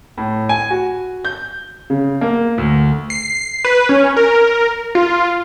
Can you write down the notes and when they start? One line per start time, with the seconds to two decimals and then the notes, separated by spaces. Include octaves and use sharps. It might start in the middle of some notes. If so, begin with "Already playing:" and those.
0.18 A2
0.49 G#5
0.70 F#4
1.25 G6
1.90 C#3
2.21 A#3
2.58 D2
3.10 C7
3.65 B4
3.89 C#4
4.17 A#4
4.95 F4